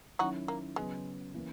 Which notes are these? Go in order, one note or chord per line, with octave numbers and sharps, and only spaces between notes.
D#3 F#3 C#4 D#4 E4 F#4
A#3
C#3 F#3 G#3 B3
E3 A#3 C#4